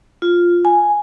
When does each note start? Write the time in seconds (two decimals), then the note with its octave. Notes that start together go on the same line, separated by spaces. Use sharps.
0.22 F4
0.65 G#5